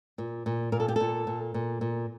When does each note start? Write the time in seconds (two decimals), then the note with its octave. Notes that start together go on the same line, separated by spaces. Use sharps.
0.18 A#2
0.46 A#2
0.72 A#2 A#4
0.80 A4
0.88 G4
0.96 A#2 A4
1.27 A#2
1.54 A#2
1.81 A#2